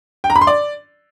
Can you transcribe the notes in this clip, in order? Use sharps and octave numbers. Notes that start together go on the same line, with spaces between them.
G5
A#5
B5
C6
D5